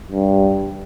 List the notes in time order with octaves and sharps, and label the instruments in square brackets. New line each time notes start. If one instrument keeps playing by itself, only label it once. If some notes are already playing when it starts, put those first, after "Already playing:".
[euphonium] G2